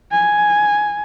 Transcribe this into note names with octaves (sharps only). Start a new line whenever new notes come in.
G#5